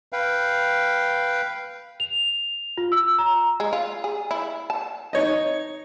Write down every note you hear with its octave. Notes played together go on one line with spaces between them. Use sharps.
B4 F5 G5
F7
F4
E6
A#5
G#3
F4
G#4
E4
A5
D#4 C#5 D#5